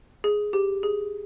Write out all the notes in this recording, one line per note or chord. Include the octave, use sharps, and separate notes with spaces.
G#4
G4
G#4